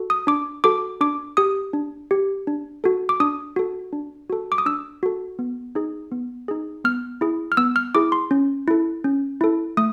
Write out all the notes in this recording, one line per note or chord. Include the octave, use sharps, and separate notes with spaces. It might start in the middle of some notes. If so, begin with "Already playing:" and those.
Already playing: F#4 A4
D#6
D4 D6
F#4 A4 D6
D4 D6
G4 D#6
D4
G4
D4
F#4 A4
D6
D4 D#6
F#4 A4
D4
F#4 A4
D6
D#6
D4 E6
F#4 A4
B3
D#4 G#4
B3
D#4 G#4
B3 F6
E4 G#4
F6
B3 E6
F6
E4 G#4 D6
C6
C#4
E4 A4
C#4
E4 A4
A3 D#6